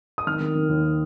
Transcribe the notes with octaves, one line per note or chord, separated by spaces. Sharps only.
D#6
D#3 F6
D#3
D#3
D#2